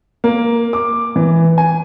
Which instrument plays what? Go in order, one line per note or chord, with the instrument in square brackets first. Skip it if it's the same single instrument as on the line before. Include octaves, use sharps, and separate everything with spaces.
[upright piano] A#3
D6
E3
G#5